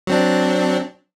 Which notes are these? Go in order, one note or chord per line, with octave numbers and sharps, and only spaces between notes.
F#3 C4 D4